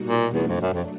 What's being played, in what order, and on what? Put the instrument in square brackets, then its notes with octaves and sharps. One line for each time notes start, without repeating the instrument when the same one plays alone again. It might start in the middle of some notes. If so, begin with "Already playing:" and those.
Already playing: [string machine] B2 G3 A#3 D#4 F#4
[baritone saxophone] A#2
[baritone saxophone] E2 [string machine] F#3 A3 D4
[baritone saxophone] F2
F#2
F2